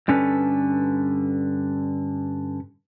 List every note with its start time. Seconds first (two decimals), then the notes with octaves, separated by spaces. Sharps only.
0.08 G2 D3 C#4 A4 B4